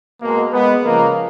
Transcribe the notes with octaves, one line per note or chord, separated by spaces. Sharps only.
B2 G#3 A#3
G#3 B3
C#3 F3 G#3 A#3